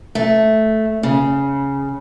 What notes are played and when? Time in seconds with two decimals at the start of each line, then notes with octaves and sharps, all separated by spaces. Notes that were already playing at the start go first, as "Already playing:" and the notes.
0.15 A3
1.03 C#3